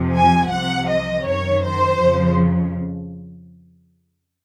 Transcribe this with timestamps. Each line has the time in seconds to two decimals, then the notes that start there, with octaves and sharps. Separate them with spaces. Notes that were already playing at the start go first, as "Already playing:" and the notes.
Already playing: F2 C3 F3
0.13 G#5
0.50 C2 C3 F3 F#5
0.88 D#5
1.26 F#2 D#3 C#5
1.63 C5
2.00 F2 C#3 F3